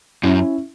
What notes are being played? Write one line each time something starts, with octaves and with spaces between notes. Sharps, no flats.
F#2 C#4 E4